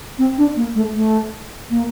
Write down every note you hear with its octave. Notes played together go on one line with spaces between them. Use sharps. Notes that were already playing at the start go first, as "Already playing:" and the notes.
C4
D4
A#3
A3
A3
A#3